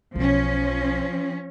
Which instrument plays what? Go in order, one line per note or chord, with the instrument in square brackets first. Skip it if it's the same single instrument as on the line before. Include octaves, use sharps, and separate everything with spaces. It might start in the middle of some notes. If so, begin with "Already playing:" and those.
[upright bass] B1 D4 [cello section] F3 C#4